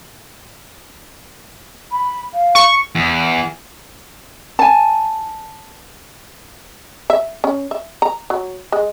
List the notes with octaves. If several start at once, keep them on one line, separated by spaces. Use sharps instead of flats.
B5
F5
C#6
E2
G#5 A5
E5
C#4
E5
A#5
F#3
G#3